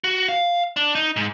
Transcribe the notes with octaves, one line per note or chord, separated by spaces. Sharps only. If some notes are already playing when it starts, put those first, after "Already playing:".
F#4
F5
D4
D#4
G#2